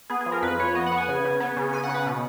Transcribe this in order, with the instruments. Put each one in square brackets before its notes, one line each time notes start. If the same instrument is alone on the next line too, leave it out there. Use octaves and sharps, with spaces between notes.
[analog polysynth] B3 G#4
G#4
F3
A#4
F2 B4
F2 C#5
B3 D#5
F#5
B3
G#5
C#3
C#3
B3
C#3
C#3 G#5
F#5
C#3
B4
B2